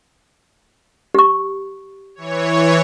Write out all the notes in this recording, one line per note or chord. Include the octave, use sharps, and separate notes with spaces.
G4 C#6
E3 C#5